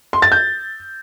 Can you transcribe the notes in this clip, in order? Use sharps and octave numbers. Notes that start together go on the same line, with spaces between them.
C6
A6
G6